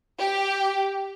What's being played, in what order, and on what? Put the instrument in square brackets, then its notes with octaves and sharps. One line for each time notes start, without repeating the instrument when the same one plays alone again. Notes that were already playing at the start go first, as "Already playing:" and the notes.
[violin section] G4